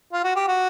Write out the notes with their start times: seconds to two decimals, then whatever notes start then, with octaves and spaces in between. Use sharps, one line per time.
0.13 F4
0.24 F#4
0.36 G4
0.48 F#4